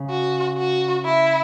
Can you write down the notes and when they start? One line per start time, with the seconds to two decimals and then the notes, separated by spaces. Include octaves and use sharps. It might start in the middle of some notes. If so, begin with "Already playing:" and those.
Already playing: C#3
0.10 F#4
0.58 F#4
1.05 E4